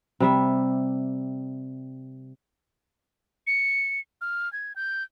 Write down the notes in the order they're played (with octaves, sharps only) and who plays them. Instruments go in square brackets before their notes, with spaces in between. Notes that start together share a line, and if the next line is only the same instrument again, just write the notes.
[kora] C3 G3 E5
[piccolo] C#7
F6
G#6
G6